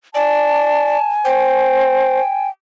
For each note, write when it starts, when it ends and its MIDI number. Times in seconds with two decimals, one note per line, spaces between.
0.14 0.97 74
0.14 2.48 80
0.14 1.11 81
1.25 2.21 72
1.25 2.49 79